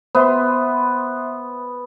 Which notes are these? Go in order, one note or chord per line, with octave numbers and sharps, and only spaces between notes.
B3 C5 E5 C6